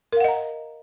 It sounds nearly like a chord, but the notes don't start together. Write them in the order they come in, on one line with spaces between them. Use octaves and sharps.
A#4 F5 F#5 D#5 A#5